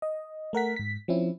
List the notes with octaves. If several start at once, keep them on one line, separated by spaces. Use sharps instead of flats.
D#5
A3 A#4 F#5 B6
G#2 B6
F3 C4 C#4 E4